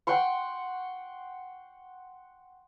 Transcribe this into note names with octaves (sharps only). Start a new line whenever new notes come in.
F#5 G5 C6 C#6